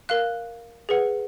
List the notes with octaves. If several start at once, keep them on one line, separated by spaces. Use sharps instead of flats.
A#4 F5 F#6
G#4 B4 F#5